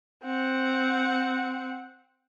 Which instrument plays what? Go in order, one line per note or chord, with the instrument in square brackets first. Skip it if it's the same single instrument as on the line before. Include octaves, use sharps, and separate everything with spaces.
[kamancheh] C4 F#5